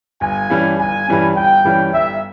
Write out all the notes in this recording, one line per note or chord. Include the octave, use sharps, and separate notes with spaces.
G1 G#5
G2 E3 G3 C#4
G1 G#5
G2 E3 G3 C#4
G1 G5
G2 E3 G3 C#4
G1 E5